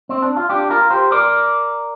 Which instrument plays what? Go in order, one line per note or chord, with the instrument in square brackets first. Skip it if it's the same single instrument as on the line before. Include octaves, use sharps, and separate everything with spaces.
[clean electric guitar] C4
D4
F4
D4 G4
F4 A#4
G4 C5
A#4 D5